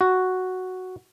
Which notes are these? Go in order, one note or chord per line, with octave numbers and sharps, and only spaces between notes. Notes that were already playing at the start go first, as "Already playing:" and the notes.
F#4